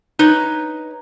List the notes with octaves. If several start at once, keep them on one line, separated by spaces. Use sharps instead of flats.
D#4 B4 C#5